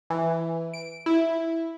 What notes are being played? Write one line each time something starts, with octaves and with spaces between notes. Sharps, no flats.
E3
D7
E4